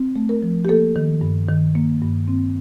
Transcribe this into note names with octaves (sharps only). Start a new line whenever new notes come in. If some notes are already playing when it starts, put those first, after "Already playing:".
Already playing: C4
A3
A#4
F3
G4
A#3 A4
D#3
G2
D#3
A#3
G2
C4